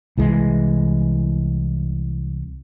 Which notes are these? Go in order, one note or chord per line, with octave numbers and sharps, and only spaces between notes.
C2 E3 G#3